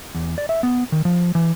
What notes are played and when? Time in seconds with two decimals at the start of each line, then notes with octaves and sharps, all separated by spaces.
0.15 E2
0.38 D5
0.49 E5
0.63 B3
0.92 D#3
1.05 F3
1.35 E3